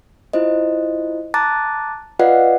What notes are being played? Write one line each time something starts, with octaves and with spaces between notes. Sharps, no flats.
E4 F4 C5 D#5
A5 A#5 D6 F#6 A6
F4 B4 D5 D#5 F5 F#5